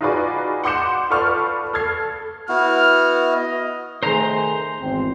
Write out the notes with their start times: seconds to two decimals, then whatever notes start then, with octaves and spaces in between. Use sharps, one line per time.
0.01 D#4 F4 F#4 G#4 B4 D5
0.64 F#5 C6 D6 G6 C#7 E7
1.10 F4 A4 B4 D5 C#6 F6
1.73 A4 F6 G#6 C7
2.49 B3 E4 F#4 F6
3.31 D#5
4.03 D#3 A3 G#4 C5 A#5
4.80 G#1 E2 C4